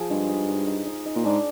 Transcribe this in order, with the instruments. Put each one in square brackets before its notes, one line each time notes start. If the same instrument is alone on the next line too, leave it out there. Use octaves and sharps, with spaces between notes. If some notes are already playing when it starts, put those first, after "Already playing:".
Already playing: [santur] F3 F4 G#4
[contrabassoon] G2 [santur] G#3
[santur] D#4
D#4
D#4
D#4
D#4
[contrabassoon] A#2
[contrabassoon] G#2 [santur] D4